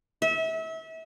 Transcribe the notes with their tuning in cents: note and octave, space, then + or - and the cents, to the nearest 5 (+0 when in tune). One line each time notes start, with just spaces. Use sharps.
E5 -30